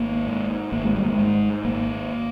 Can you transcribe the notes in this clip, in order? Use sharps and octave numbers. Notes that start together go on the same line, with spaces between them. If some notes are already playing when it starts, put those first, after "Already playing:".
Already playing: G#1 A#3
G#2
G#1 A#3
G#3
G3
G#3
G#2
G#1 A#3